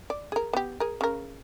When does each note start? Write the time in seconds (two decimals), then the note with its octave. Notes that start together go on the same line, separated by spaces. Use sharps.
0.10 D5
0.32 G#4 A#4
0.53 B3 G4
0.80 G#4 A#4
1.01 C#3 A#4